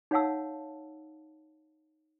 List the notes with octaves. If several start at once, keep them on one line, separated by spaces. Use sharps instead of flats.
D#4 C#5 F5 F#5 A5 E6